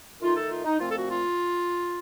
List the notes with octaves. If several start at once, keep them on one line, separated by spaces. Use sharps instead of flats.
D#3 A3 D#4 F4
A4
F4
D#4
A#2 F3 A3 C4 F4
A4
F#4
F4